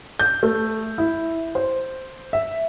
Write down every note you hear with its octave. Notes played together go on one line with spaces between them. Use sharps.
G6
A3
E4
C5
E5